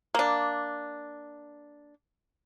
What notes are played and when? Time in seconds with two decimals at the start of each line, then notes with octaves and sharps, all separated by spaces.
0.15 A#3 D4